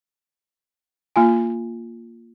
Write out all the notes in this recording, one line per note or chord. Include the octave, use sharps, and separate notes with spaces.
A#3 F4 G#5